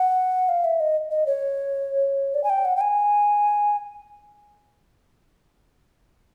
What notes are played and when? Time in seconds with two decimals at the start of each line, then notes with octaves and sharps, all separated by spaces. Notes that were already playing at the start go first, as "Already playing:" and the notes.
Already playing: F#5
0.49 F5
0.64 E5
0.80 D#5
1.11 D#5
1.26 C#5
2.34 D5
2.44 G#5
2.50 G5
2.65 F#5
2.76 G5
2.81 G#5